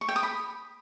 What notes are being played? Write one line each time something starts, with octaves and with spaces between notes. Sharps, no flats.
C#6
G5
D#6
B5